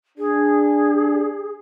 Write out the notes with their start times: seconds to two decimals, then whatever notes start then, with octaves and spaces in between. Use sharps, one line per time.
0.18 D4 G#4